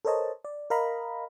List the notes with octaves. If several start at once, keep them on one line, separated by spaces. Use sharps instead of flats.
A4 A#4 C5 C#5 D#5 A5
D5
A#4 D#5 F5 A#5 B5